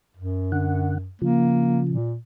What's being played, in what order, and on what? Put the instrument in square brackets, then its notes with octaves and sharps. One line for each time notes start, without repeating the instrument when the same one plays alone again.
[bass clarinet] F#2
[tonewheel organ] D3 F#5
[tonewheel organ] C#3 F3 [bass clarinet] A#3
[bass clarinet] A#2